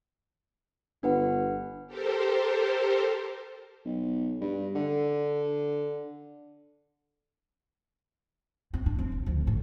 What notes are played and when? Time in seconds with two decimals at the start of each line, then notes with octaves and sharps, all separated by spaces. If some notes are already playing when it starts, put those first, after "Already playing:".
1.03 G1 D4 B4 F#5
1.87 G4 A4 A#4 C5
3.85 B1
4.41 G2
4.75 D3
8.73 C4
8.86 D4
8.98 C4
9.12 A#1
9.26 D2 F3
9.47 C#2 A2